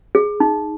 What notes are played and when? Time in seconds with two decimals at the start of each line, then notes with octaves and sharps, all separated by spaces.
0.15 G#4
0.40 D#4